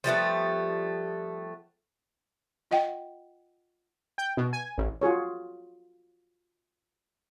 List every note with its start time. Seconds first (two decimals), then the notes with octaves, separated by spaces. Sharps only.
0.04 F3 G3 A3 B3
2.71 F4 D#5 F#5 G5
4.18 G5
4.37 B2
4.53 G#5
4.78 A1
5.01 F4 F#4 G#4 C#5